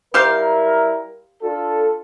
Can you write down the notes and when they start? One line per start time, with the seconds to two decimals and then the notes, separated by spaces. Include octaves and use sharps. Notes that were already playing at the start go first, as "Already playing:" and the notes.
0.14 G3 E4 G4 A#4 C5 F5
1.43 D4 F4 A4